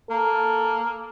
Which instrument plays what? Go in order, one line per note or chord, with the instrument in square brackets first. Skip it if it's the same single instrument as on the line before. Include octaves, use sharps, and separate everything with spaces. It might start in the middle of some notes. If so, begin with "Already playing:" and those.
[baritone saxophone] A#3 [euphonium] A4